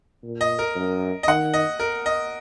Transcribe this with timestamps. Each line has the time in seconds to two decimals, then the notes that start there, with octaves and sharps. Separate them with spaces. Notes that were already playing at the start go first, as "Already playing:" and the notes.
0.23 A#2
0.41 D#5
0.59 A#4
0.76 F#2
1.23 D#5
1.28 D#3 F#5
1.54 D#5
1.79 A#4
2.06 D#5